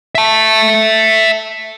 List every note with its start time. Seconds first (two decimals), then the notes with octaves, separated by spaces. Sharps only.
0.15 E5 A5